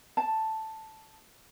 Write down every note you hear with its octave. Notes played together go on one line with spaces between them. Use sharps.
A5